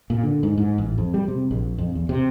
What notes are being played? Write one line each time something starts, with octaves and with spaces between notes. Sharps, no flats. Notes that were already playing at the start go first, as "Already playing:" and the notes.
A#2
D3
G#2
G#2
A1
F2
G3
C3
A#1
F2
E2
C3